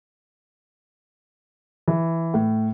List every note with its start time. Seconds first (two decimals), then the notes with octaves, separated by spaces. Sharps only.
1.88 E3
2.34 A2